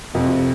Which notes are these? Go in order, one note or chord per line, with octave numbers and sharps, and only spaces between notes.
F2 C3